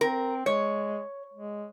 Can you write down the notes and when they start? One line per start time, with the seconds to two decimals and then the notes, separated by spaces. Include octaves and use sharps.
0.01 C4 A#4
0.46 G#3 C#5
1.33 G#3